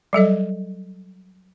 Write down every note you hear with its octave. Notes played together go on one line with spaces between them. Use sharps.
F#3 G3 A4 D#5